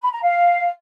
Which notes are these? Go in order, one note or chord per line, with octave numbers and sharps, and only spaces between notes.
B5
A#5
F5